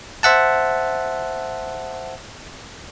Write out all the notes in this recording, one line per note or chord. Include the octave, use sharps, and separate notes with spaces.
C5 E5 F#5 A5